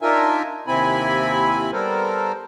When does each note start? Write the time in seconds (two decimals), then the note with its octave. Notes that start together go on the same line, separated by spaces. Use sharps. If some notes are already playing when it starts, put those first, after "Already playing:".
0.02 D4 D#4 F4 A#4 E5 G#5
0.67 D#2 C3 C4 E4 G#5 B5
1.73 G3 B3 A4 A#4 C5